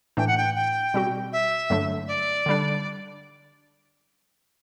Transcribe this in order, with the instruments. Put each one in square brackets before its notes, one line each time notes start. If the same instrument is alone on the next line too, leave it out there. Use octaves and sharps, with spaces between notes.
[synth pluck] A2 E3 A3 D4 [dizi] G5
[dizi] F#5
G5
G5
[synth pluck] B2 G3 C4 F#4
[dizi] E5
[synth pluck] G2 D3 F#3 A3 D4
[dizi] D5
[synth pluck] D3 G3 D4